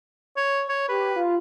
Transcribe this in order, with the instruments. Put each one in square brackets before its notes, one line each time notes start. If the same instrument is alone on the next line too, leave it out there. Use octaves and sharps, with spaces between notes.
[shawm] C#5
C#5
[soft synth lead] G4 [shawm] B4
[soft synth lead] F4